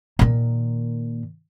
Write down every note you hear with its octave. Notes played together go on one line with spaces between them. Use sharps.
A#2 D#3